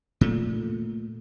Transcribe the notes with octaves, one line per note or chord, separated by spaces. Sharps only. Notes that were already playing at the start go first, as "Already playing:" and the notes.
A#2 A3